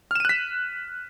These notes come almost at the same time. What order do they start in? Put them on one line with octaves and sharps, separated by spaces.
F6 E7 D#7 F#6 B6